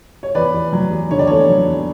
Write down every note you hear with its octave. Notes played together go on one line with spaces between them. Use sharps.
C#5
E2 B4 D5
E2
F#3
E2
D3 C#5
D5
E2 A4 C#5
F#3
E2